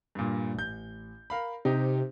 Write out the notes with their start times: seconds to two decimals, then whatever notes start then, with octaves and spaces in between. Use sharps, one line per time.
0.15 G2 A#2
0.54 A1 G6
1.30 A#4 F5 B5
1.65 C3 D#4 G4